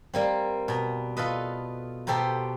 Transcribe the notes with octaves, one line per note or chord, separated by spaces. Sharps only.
G3 A#3 C4
B2 A#5
F4 A4 B4 D#5
B2 G4 A4 C5 G5 A#5